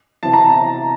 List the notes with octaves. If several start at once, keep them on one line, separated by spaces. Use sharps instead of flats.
C3 E3 A5
A#5